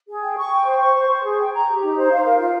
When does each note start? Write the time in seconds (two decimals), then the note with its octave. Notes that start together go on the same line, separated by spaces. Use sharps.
0.08 G#4
0.23 G5
0.37 C#6
0.52 G5
0.66 C5
0.80 C#6
0.95 C5
1.09 C5
1.24 G#4
1.39 G5
1.53 A#5
1.68 G4
1.82 D#4
1.97 C5
2.11 F5
2.25 A#4
2.39 F4